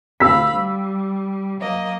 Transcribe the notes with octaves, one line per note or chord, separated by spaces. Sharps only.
D2 F5 B5 E6 B6
G3
F#3 A#3 D#5